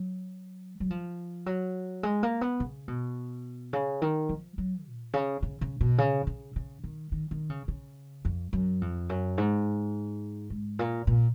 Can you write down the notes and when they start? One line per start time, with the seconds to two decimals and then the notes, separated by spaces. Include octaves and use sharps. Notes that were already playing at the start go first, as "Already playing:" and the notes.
Already playing: F#3
0.80 F#3
0.90 F3
1.46 F#3
2.03 G#3
2.23 A#3
2.41 B3
2.60 C#3
2.88 B2
3.73 C#3
4.02 D#3
4.29 F3
4.58 F#3
4.86 A#2
5.13 C#3
5.42 C#3
5.61 C#3
5.81 B2
5.98 C#3
6.27 C#3
6.56 C#3
6.84 D#3
7.12 D#3
7.31 D#3
7.50 C#3
7.68 C#3
8.25 F2
8.53 F#2
8.81 F2
9.09 F#2
9.38 G#2
10.50 G#2
10.79 A#2
11.07 A#2